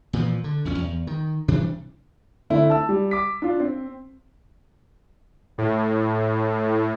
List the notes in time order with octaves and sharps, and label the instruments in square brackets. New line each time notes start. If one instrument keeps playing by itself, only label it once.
[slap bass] A#2 E3 F3
D3
B1 F2 C#4
E2
D#3
C3 E3 G3 D4
[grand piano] D3 A3 C4 E4
A5 E6
G3
D6 B6
D4 F4
C4
[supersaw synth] A2